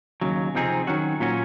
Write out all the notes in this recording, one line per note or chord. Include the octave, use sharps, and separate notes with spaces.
D#2 C#3 F#3
C3 F3 C4 D#4 G#4
D#3 F#3 C#4 F#4
A#2 F#3 C#4 F#4